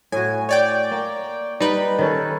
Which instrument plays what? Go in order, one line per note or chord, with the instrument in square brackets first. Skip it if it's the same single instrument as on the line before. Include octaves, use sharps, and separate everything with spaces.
[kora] A2 F#4 [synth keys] G#5
[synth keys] C#5 D5 G5
[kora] A#3
[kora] G3 [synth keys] D#4 B4
[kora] D#3 C#4 A4